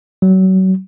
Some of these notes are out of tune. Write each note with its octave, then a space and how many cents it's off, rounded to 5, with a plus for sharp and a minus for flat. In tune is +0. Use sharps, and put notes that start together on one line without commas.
F#3 +30